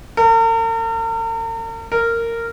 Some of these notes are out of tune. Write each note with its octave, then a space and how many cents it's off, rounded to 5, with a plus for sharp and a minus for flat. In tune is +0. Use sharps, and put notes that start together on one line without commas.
A#4 -45
A#4 -15